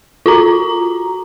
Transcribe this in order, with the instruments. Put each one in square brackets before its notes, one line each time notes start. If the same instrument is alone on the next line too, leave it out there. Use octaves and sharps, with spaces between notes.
[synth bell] F4 F#4 A#5